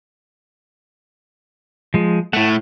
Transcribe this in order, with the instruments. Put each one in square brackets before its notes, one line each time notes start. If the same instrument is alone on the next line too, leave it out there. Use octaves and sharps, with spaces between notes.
[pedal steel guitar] F3 G#3
[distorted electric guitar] A2 A3 [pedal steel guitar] F#5 A5